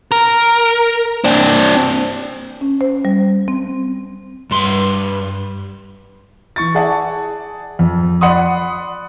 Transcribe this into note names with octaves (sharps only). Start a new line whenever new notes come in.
A#4
C4 D4
C#4
C5
G3
C4
G2 C6
E3 C#6 A6
G#4 D5 E5 F#5 A5
F2
D5 F#5 B5 C6 D#6